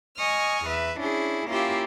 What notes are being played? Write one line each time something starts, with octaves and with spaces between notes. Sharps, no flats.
D#5 G#5 C#6 D#6 F6
E2 B4 E5
C#4 D4 E4 G#4
A#3 C#4 E4 F4 G4 E5